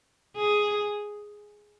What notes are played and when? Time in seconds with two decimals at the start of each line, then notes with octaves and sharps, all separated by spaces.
0.36 G#4